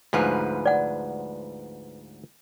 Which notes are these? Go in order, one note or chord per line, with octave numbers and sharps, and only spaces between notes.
D2 G#2 F3 A#4 B4 G#5
D5 F#5